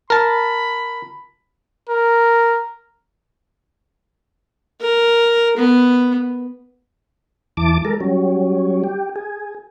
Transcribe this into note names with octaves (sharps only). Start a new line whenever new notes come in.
A#4 A5 B5
A#4
A#4
B3
E2 E3 A5 D6
G#3 A4 A#4
F#3 G3 C#4
G4
G#4